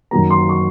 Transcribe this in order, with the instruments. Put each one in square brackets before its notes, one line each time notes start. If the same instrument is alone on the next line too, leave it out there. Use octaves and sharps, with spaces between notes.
[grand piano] F#2 D#3 F#3 A#3 A#5
C6
C#6